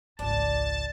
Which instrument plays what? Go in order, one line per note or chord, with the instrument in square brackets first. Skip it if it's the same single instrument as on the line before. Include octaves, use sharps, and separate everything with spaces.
[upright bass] G#1 C#2 [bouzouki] D4 [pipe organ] A5